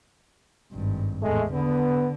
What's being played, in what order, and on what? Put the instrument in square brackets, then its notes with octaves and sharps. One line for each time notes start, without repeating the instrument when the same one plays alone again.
[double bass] G#1 G2
[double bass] E2 A2 [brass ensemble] G#3 A3
[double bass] D3 [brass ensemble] B3